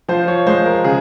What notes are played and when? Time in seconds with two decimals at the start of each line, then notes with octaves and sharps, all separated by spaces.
0.08 F3 C5
0.28 C#5
0.47 G#3 C5
0.65 A#4
0.84 C#3 G#4